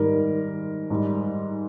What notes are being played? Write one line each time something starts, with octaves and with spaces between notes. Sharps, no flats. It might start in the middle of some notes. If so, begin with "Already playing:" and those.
Already playing: G#2 D#3 G3 A#4
G#2 G3